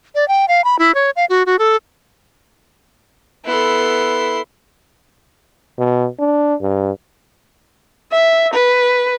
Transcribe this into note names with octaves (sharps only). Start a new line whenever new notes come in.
D5
G5
F5
B5
E4
C#5
F5
F#4
F#4
A4
B3 E4 A4 C6
B2
D4
G2
E5
B4